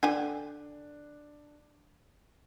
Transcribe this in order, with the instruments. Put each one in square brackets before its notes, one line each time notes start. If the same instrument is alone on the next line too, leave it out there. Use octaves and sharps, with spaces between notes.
[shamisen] D3 G5 G#5 [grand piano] D4